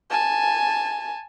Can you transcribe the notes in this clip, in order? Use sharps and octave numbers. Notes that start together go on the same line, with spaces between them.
G#5 A5